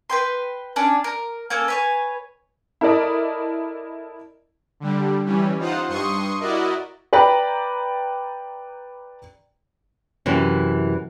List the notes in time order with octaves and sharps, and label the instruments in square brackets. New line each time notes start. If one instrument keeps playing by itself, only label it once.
[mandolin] B4 G5 C6
C#4 D4 D5
A#4
A#3 C#4 A4
B4 C#5 G#5
[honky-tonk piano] E4 A4 A#4 D5 D#5
[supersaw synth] D3 G3
E3 G3 C#4
D#4 F4 C5 F#5
G2 C6 C#6 D#6 C#7
E4 F#4 A#4 D5 D#5
[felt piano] B4 D5 G5 A#5 B5
[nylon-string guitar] F#2 C3 E3